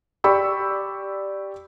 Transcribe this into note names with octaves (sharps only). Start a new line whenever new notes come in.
G4 D5 G5 B5 C#6 E6